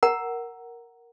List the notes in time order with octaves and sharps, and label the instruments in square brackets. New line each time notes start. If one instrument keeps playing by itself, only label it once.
[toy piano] A#4 F#5 A#5